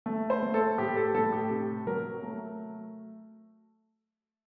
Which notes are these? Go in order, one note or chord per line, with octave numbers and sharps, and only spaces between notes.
A3
C5
A3
A4
A2 G4
A4
A2 A4
G4
C3
F#3 A#4
A3